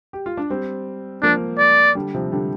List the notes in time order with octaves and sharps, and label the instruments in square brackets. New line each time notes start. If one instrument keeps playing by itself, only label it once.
[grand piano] G4
F4
D4
G3 C4
[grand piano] F3 A#3 [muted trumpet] D4
[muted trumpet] D5
[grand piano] D3 G3
C3 F3
D3 G3